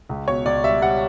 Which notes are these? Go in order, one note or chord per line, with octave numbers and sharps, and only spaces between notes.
C#2
B2 C#5
C#2 D5
G3 E5
G3 F#5